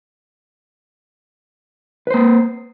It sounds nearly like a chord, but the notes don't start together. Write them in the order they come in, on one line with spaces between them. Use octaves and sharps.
B4 C5 A#3